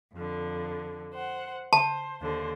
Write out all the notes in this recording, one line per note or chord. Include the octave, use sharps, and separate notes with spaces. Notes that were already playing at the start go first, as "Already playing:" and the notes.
F2 D3
C5 F#5
C5 A5
D#2 D3 C5